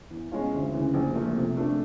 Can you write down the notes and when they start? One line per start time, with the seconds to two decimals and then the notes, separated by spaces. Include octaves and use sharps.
0.10 E2
0.32 B2 G#3 C#4 F4
0.53 D2
0.73 C#3 E3
0.94 A#1
1.14 A#2 F3 A3
1.36 C3
1.57 F3 A3 D4